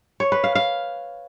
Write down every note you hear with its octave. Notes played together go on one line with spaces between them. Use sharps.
C#5
B4
F5
F5